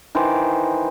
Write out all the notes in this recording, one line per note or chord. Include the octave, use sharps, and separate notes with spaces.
D#3 E3 C5 D6